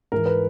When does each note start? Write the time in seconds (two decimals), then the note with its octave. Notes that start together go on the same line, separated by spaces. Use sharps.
0.12 G#2 E3 A#4
0.26 B4